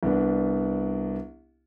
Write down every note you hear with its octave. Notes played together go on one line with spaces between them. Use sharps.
C2 B3 D4